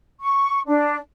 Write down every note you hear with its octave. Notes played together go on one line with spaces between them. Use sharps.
C#6
D4